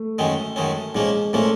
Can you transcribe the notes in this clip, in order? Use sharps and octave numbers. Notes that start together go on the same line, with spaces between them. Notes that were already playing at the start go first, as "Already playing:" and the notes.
Already playing: A3
F#2 D#3 G#3 C#4
F#2 D#3 G#3 C#4
A#2 F3 G#3 A#3 C#4
A#2 F3 A3 A#3 C#4